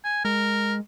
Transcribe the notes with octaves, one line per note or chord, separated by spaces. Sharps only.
G#5
G#3 A#4